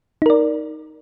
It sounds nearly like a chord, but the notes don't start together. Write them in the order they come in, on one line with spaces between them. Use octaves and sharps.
D#4 A#4 D5